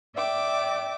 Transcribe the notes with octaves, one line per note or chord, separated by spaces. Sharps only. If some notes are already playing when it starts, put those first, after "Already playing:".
D5 E5 G5 D6